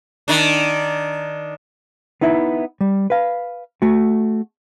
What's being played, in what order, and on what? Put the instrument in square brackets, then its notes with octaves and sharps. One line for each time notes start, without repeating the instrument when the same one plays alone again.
[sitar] D#3 D4
[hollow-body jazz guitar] B3 D#4 E4 E5
G3
B4 F5
A3 F#4